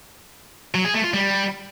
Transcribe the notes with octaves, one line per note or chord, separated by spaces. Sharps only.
F#3
G#4
A3
F4
G3